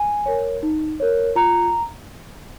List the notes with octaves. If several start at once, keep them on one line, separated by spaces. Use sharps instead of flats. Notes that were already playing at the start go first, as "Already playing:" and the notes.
Already playing: G#5
A#4 C#5
D#4
A#4 C#5
F4 A#5